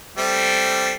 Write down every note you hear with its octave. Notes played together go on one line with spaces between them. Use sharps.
G3 A3 C4